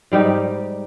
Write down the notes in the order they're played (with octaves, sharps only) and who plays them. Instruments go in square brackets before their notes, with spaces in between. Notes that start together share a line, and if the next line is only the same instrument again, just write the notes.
[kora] G#2 G3 D#4 G4